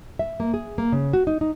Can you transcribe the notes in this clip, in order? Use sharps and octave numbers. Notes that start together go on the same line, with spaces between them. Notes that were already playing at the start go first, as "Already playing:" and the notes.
E5
A#3
G#4
A#3
C#3
F#4
D#4
D#4